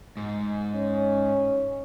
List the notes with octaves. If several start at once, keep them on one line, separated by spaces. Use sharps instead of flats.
G#2
C#4